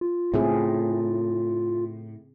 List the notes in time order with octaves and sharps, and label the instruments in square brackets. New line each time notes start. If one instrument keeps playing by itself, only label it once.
[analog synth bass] F4
[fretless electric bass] A2 [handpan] C#3 C4 G#4